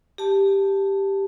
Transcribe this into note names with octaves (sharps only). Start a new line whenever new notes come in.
G4 A5